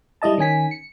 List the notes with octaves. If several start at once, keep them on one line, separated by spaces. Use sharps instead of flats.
G3 E4 D#5 A5
D#3 C#4 G#5 B6
C#7